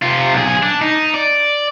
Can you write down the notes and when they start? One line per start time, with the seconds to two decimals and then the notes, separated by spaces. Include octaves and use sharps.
0.03 C3 F4
0.33 B1 G#4
0.62 D4
0.81 D#4
1.14 D5